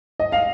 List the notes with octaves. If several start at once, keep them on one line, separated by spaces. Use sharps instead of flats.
D#5
F5